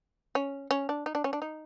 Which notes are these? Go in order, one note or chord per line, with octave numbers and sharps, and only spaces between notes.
C#4
C#4
D4
D#4
D4
C#4
D4
D#4